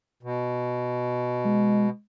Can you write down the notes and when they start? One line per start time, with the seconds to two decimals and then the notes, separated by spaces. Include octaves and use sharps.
0.23 B2
1.45 G#3